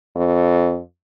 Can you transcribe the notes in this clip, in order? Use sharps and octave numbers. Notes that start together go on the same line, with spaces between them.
F2